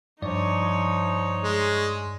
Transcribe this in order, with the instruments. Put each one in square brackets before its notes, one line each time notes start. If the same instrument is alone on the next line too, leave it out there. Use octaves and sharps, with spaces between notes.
[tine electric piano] G2 D5 [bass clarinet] F3 [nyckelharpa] D#4 C#5
[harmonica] G#3